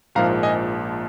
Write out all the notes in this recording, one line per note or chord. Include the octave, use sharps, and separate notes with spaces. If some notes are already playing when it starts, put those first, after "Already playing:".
A#1 G#2 F3 A#3 F5 A#5
D#5 G#5